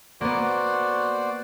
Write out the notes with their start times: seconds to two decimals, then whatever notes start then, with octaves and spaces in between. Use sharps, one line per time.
0.21 A#3 B3 F#4 C5 D5